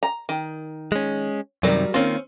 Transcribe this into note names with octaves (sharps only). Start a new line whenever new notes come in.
A#5
D#3
G#3 C#4
F#2 C3 D#3 F#3 G3 A#4
D#3 A#3 C4 C#4 F4